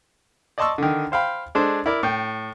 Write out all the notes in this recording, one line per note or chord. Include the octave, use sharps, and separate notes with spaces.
D5 D#5 A5 C6 C#6 E6
D3 D#3
C5 F5 G5 B5
G#3 D4 A4 C5
E4 A#4 D5
A2 G5